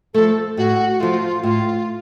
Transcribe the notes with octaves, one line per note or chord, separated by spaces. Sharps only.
F3 A3 A4
A2 F#4
F3 A3 F4
A2 F4